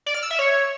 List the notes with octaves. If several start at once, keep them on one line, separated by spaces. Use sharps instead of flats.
D5
F6
E6
E5
C#5